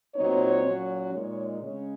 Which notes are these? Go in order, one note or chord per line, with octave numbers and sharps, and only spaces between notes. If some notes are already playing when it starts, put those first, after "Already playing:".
A#2 F#3 C4 D#4 C#5
A#2 F#3 C#4
A#2 G#3 D#4 C#5
C#3 G#3 C#4